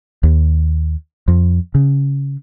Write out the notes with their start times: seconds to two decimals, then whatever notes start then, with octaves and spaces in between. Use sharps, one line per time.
0.23 D#2
1.28 F2
1.75 C#3